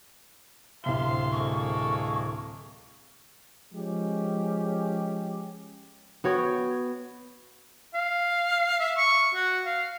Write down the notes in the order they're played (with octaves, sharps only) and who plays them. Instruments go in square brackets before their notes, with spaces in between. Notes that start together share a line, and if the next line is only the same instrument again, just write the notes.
[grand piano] D1 C3 G7 [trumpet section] E5 F5 C6
[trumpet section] G#3 A#3 A4 [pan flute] C#6
[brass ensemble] F3 G#3 C#4 G4
[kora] B3 F#4 C#5 G5
[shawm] F5
E5
C#6
F#4
F5